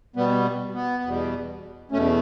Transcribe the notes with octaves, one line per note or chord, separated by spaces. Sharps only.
B2 G3 B3
B3
E2 B2 G3
E2 B2 A3 C#4